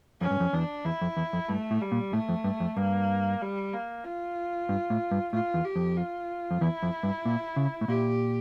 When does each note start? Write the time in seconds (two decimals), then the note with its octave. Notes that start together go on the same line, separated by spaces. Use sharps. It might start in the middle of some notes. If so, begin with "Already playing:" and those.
0.21 F2 C#4
0.31 G2
0.40 F2
0.53 E2 D4
0.85 E2 E4
1.01 F2
1.17 E2
1.33 F2
1.48 G2 A3
1.71 A2
1.81 G3
1.92 A#2
2.13 A2 A3
2.29 F2
2.44 G2
2.60 F2
2.77 G2 A#3
3.41 G3
3.73 A#3
4.04 F4
4.69 G2
4.90 A2
5.11 G2
5.33 A2 F4
5.54 E2
5.64 G4
5.76 F2
5.97 F4
6.51 F2
6.61 E2 E4
6.83 F2
7.03 G2
7.25 A#2
7.56 C#3
7.81 A2
7.88 A#2 G4